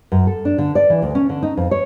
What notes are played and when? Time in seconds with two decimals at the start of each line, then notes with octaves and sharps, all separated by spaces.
0.12 F#2
0.27 A4
0.45 D4
0.58 D3
0.75 D5
0.90 E3
1.02 D2
1.15 C#4
1.29 D3
1.43 D#4
1.57 F2
1.71 C#5